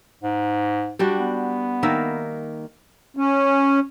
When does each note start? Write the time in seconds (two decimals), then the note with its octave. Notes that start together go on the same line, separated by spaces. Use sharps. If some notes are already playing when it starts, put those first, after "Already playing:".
0.23 G#2
0.99 G3 D4 F#4
1.20 B3
1.83 D#3 A#3 E5
3.17 C#4